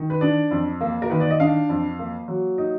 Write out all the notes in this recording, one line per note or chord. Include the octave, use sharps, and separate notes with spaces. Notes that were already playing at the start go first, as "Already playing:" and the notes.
Already playing: D#3
B4
D4 D5
F2
A#3
A#4
D#3 B4
D5
D#5
D4 F5
F2
A#3
F#3
D#4